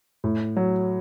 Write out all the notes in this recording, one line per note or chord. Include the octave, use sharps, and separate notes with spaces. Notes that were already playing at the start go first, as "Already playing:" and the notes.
A2
F#3